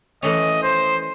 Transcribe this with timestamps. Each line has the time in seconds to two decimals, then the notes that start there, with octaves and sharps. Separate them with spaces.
0.23 E3 A3 C#4 D#5
0.63 C5